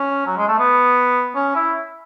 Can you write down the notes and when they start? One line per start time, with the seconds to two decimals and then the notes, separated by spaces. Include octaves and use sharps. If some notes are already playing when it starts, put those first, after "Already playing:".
Already playing: C#4
0.27 F#3
0.37 G#3
0.48 A3
0.58 B3
1.35 C#4
1.55 E4